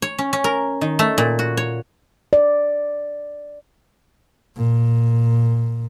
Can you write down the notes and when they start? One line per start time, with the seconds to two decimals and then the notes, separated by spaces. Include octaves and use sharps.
0.02 C#5
0.18 C#4
0.33 C#4
0.44 A#4
0.81 D#3
0.99 A3
1.18 A#2
1.39 F#4
1.57 C#5
2.33 D5
4.56 A#2